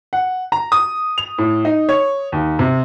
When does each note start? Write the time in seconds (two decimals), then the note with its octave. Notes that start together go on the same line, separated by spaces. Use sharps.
0.13 F#5
0.52 A#5
0.72 D#6
1.18 F7
1.38 A2
1.65 D#4
1.89 C#5
2.32 D#2
2.59 C3